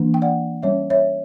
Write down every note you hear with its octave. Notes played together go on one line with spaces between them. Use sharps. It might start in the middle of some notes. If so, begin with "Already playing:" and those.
Already playing: E3 A#3 D4
G5
D5 F#5
G3 C#4 C#5 E5
C#5 E5